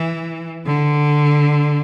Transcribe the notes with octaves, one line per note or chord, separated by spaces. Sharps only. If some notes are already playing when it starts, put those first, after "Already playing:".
Already playing: E3
D3